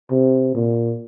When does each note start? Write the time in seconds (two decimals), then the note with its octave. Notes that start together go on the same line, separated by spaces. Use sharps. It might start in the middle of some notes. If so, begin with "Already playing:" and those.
0.11 C3
0.55 A#2